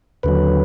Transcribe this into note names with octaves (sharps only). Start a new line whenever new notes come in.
D#2 D3 F#3 B4